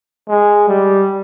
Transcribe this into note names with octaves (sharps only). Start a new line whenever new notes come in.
G#3
G3